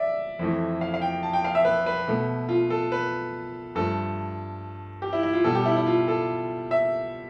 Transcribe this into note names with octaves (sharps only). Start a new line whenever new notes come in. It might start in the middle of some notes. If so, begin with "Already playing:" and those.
Already playing: D5 E5
F2 E3 A3
F5
F5
G5
A5
G5
F5
E5
B4
B4
B2 A3
F4
A4
B4
G2 F3 A3 A4
G4
E4
E4
F4
B2 G3 A4
G4
E4
E4
F4
A4
E5